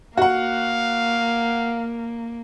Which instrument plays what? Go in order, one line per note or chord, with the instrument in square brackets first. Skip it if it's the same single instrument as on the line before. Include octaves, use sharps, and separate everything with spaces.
[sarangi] A#3 [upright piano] F#4 F#5 [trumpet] F5